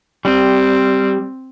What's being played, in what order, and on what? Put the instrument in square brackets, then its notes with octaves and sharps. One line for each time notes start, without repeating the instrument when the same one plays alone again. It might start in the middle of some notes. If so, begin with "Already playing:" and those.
[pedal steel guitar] G3 [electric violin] C4